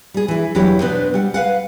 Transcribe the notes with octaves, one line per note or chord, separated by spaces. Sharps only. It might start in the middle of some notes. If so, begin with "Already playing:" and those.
G3 G#4
E3 E4
E2 F#3 G3 E4 G4
B2 B3 C4 D4 B4 C5
G3 F#5
B4 F5 F#5